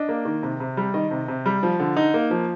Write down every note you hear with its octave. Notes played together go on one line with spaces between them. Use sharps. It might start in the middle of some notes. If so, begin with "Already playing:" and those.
Already playing: D4 D#5
A#3
D#3
C3
C3
G3
D#3 D#5
C3
C3
G3
F3
D3
D#4
A#3
F3